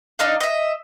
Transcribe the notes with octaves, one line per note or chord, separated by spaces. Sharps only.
D4 D#4 D#5 F5
D#5 E5